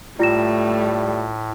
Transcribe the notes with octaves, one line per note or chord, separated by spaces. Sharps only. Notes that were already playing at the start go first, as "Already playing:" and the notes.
A2 G3 A3 F4 A#6 E7